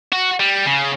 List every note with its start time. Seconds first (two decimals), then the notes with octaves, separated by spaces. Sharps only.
0.13 F#4
0.40 G3
0.66 C#3